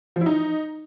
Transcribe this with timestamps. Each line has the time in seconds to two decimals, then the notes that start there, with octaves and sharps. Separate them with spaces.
0.16 F3
0.21 E4
0.26 D#4